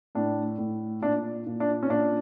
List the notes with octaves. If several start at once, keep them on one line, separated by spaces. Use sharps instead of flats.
A2 D4
A2
A#2 D4
A#2
D4
C#4
A#2 D4